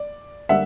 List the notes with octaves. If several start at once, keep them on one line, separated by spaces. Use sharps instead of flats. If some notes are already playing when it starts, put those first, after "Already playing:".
Already playing: D5
D3 G3 A#3 E5 F#5